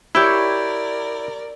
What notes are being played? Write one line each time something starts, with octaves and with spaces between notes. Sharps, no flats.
E4 G4 A#4 C#5 D5 G5 E6 G6